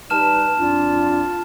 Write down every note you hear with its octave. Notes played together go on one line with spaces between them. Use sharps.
G3 D#4 B4 A5 F6 E7
F2 D4 F4